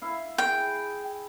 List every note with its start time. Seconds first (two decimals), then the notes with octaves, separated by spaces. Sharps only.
0.01 E4 E5 F5
0.38 G#4 G5